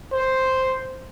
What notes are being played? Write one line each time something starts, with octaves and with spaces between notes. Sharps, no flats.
C5